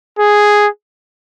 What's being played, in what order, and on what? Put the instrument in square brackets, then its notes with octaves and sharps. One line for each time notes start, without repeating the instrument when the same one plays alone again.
[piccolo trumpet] G#4